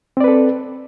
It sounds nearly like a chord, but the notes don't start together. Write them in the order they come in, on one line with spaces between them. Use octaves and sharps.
C4 D5 B4 A4